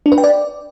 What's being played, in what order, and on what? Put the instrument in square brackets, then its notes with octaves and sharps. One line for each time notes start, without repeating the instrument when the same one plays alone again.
[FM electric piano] D4
B4
G5
D5